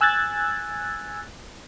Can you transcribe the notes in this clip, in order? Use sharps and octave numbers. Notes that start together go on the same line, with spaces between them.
G#5 E6 F#6 G#6 A6